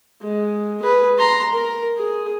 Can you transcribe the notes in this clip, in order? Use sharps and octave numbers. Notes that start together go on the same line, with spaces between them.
G#3
G#4 B4
A#5 C6
A#4
G#4